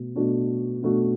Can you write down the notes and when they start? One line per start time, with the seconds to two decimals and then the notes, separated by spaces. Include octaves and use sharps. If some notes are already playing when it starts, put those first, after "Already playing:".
Already playing: B2 A3
0.16 B2 A3 D4 F#4
0.83 B2 A3 D4 F#4